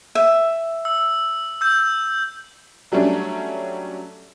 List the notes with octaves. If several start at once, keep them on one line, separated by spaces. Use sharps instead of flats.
E5
E6
E6 G6
F#3 G3 A3 C#4 D4